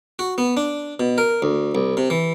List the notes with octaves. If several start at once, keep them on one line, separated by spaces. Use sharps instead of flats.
F#4
B3
D4
B2
A#4
D2
C2
C3
E3